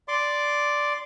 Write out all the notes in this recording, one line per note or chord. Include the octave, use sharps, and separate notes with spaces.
D5 C6 D6